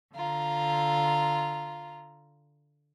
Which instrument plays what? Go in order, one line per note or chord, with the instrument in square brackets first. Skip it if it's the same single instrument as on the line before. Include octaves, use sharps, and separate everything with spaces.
[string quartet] D3 F4 A#5